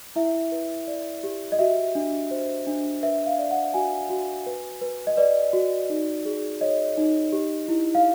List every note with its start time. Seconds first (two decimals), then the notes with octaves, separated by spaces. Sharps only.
0.16 E4 E5
0.52 B4
0.87 D5
1.24 G4
1.52 D#5
1.59 F#4 E5
1.95 D4
2.31 C5
2.67 D4
3.03 B4 E5
3.26 F5
3.39 D5
3.51 F#5
3.74 F#4 G#5
4.10 F#4
4.46 B4
4.81 B4
5.07 D#5
5.17 B4 D5
5.53 F#4
5.90 D#4
6.25 G#4
6.61 C#5 D#5
6.97 D#4
7.33 G4
7.68 E4
7.95 F5